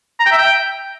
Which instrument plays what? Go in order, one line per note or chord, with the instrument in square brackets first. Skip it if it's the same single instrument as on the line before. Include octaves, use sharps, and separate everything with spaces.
[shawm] A#5
G5
E5
G5